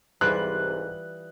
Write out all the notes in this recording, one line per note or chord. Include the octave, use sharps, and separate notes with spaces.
C2 G#2 E3 G3 F4 F#6